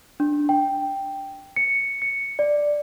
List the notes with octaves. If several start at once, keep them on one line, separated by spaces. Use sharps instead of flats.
D4
G5
C#7
C#7
D5